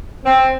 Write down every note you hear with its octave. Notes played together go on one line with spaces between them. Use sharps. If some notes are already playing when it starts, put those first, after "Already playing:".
C4